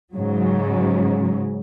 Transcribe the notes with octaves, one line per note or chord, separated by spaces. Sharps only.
G#2 C#3 F#3